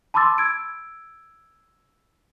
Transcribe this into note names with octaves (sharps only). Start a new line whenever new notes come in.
A5 B5 C6 D6 E6 A6
E6 G#6 D7